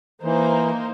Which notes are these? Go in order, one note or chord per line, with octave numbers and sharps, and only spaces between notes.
E3 A#3 D#4 C5